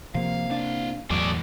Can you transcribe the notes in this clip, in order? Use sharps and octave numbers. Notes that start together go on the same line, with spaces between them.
C3 F3 A#3 F5
D4 E4 F5
E2 A2 E3 F#3 G#3 A3 D5